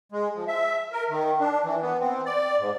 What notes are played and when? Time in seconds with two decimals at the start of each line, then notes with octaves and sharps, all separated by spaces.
0.12 G#3
0.35 F3
0.47 E5
0.92 A#4
1.10 D#3
1.40 D4
1.65 E3
1.82 B3
2.00 C4
2.25 D5
2.59 G#2